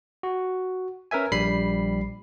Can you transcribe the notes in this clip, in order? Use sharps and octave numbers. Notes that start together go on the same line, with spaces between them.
F#4
C#4 A#4 B4 E5 G#5
A#1 G3 B5 C7